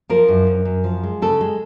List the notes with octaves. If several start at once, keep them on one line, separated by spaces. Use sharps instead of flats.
F3 A#4
F#2
F#2
F#2
F3
G#3
C#3 A4
G#3